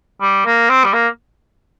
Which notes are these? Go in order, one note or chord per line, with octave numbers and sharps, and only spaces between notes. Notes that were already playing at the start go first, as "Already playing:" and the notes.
G3
A#3
C4
G3
A#3